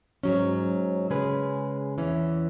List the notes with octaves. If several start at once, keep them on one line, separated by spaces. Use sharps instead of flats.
G#2 F#3 C#4
C#3 G#3 C#4 G#4 B4
E2 E3 C#4